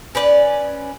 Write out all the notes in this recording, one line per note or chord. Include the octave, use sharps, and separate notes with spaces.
C#4 B4 D5